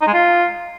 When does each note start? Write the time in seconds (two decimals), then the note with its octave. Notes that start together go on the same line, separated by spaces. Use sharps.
0.01 D#4
0.07 G#3
0.13 F4